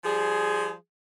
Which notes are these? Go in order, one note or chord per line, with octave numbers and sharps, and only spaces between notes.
F3 G3 G#4